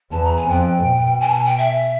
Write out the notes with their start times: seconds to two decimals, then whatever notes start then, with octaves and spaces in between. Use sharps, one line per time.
0.11 E2 A5
0.24 A#5
0.36 G#5
0.48 F2 G5
0.84 B2
1.20 G#5
1.28 A5
1.33 G#5
1.45 G5
1.57 E5